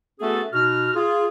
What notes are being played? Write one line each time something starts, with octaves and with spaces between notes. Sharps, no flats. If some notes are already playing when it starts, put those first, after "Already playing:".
A3 B3 C#4 F#4 G#4 A4
B2 D#4 F#4 F6
F4 G#4